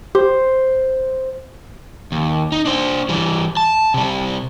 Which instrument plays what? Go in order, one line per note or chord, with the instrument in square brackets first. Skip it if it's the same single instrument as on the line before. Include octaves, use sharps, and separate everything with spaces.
[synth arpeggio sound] G4 [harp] C5
[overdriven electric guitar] D#2
D#4
D4 C5
E3 G3
A5
C3 G3